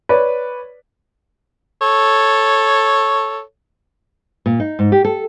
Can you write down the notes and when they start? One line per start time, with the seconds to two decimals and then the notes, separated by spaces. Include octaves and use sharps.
0.09 B4 C#5 D5
1.82 A4 C#5
4.46 A#2
4.60 D#4
4.79 G#2
4.92 G4
5.05 A4